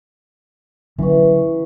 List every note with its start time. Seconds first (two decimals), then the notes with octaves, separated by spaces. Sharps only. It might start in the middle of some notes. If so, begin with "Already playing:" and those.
0.98 D3 E3 F#3 C#4 F#4